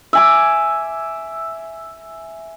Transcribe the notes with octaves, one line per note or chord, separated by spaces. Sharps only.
E5 G#5 D6